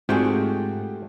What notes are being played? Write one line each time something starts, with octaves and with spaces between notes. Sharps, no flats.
G#2 G3 A3 C4 F4 F#4 G#4 G5